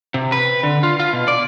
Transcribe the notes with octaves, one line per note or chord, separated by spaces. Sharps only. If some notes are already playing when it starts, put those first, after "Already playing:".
C3
B4
D3
F4
F4
B2
D5